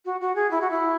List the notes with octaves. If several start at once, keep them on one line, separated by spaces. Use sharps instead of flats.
F#4
F#4
G#4
E4
F#4
E4